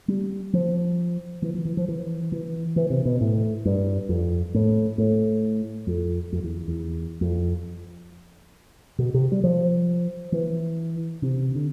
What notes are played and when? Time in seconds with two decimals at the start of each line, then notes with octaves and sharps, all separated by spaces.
0.08 G3
0.53 F3
1.42 E3
1.54 F3
1.65 E3
1.77 F3
1.88 E3
2.32 E3
2.76 E3
2.90 C3
3.05 B2
3.21 A2
3.65 G2
4.09 F2
4.54 A2
4.98 A2
5.87 F2
6.32 F2
6.44 E2
6.68 E2
7.21 F2
8.98 B2
9.14 C3
9.32 G3
9.44 F3
10.32 E3
11.22 C3
11.55 D3